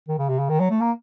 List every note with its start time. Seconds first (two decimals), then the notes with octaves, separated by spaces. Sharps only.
0.08 D#3
0.18 C#3
0.29 C3
0.39 C#3
0.49 D#3
0.60 F#3
0.70 A3
0.80 A#3